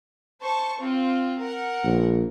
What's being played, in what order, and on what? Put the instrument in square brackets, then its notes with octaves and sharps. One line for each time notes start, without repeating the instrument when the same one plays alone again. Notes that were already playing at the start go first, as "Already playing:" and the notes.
[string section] C5 A5 C#6
C4 F4
A#4 F#5
[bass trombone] A#1